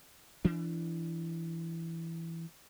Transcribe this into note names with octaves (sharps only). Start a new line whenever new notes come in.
E3 D4